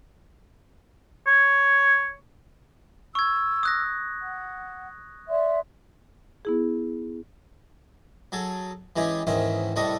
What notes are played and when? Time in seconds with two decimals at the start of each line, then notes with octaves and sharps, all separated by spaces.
1.27 C#5
3.15 C#6 E6 G#6
3.63 D#6 F#6 A#6
4.20 F#5
5.29 D5 E5 C6
6.45 B3 E4 G#4
8.32 F#3 G#4 A4
8.96 E3 G#3 C#4 G4 G#4
9.27 E2 G#2 D#3 C#4 C5 E5
9.76 C2 A2 G3 A4 D#5 C#6